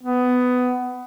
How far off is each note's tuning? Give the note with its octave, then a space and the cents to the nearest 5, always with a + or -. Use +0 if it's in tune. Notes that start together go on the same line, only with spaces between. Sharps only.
B3 +15